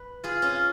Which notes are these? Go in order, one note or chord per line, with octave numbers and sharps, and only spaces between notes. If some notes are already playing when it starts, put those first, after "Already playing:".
Already playing: B4
F4 G#4
C#4 F4